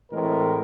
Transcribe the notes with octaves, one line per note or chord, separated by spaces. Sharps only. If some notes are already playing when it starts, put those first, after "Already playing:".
A2 E3 G#3 C4 A#4